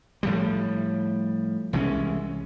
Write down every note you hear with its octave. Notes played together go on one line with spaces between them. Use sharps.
A2 F3 G3
C2 E3 G#3 C#4